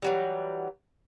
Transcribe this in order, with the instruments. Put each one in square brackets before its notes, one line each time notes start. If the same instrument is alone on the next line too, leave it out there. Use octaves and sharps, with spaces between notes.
[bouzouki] E3 F#3 G3